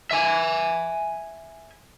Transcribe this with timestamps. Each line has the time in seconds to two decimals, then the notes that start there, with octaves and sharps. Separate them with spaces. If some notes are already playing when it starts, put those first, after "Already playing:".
0.11 E5 G#5